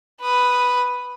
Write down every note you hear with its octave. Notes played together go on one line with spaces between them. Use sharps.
B4 D#6